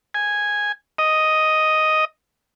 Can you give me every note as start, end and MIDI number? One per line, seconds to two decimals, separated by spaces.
0.15 0.72 80
0.98 2.05 75